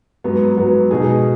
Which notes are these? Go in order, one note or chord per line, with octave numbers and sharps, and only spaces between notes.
G#2 F#3 B3
G#2 F#3 B3
B2 G#3 D#4 G#4